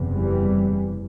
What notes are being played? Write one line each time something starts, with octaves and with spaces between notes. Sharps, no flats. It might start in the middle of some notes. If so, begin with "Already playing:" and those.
Already playing: F#1 E2 C3
E3 G3